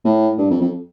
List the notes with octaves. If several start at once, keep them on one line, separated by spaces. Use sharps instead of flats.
A2
G2
F2
F2